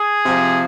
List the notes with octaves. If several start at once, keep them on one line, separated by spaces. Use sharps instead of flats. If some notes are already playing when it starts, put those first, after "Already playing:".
Already playing: G#4
C3 F3